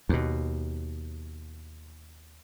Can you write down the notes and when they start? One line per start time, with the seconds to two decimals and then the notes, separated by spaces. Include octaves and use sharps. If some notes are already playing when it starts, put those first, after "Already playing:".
0.09 D#2 B2